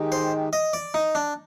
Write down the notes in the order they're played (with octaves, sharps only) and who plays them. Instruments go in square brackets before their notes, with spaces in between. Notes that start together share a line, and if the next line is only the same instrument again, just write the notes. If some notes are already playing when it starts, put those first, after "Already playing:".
Already playing: [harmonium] D#3 G#3 D#4 G4
[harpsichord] C5
D#5
D5
D#4
D4